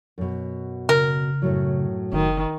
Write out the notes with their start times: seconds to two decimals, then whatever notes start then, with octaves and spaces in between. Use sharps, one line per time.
0.18 F#2 B2
0.89 C#3 A#4
1.42 F#2 A2 F#3
2.13 F#1 D#3